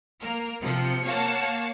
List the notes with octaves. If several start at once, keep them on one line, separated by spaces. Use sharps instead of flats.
A#3 A#4 F6
C3 F3 C#7
A#3 C#5 F5 F#5 A5